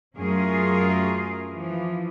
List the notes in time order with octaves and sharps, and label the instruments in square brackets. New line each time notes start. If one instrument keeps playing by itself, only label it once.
[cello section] F#2 A3 C#4 F4 G#4 A#4
E3 F3